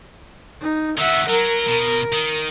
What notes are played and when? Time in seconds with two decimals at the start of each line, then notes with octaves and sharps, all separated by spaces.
0.61 D#4
0.98 D#3 F#4 E5 F#5
1.29 F#3 A#4
1.68 B2
2.12 D#3